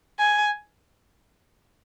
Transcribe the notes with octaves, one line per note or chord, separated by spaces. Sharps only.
G#5